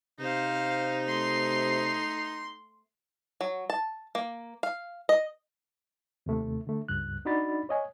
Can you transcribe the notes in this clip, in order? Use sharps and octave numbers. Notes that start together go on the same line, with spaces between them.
C3 D#4 C5 F5
A3 C6 C7
F#3
A5
A#3
F5
D#5
D#2 C3 A3
D3 A3
C#2 G2 F#6
D4 D#4 F#4 D5 B5 A6
C#5 D#5 G#5